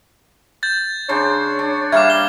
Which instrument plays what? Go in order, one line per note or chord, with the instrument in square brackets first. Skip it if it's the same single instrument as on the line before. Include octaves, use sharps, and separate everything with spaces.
[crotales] G6 A6
[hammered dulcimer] C#3 D4 C5 [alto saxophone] C#5
[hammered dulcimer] D4
[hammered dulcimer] G3 A#3 F5 [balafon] E5 [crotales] D6 G#6
[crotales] G7